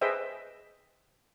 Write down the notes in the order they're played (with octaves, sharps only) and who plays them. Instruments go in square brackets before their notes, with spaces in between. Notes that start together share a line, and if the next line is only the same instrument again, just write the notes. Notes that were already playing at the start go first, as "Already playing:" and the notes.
[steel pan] G#4 B4 C5 D#5 E5 G5